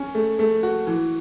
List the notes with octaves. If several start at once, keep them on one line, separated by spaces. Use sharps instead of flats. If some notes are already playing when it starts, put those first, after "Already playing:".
Already playing: C#4
A3
A3
F#4
E3